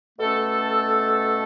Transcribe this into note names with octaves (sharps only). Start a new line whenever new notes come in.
B2 A3 C#4 A4